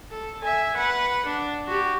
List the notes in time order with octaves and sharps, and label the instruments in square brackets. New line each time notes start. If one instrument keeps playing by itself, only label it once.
[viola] A4
E5 G#5
B4 F#5
D4
F#4 G4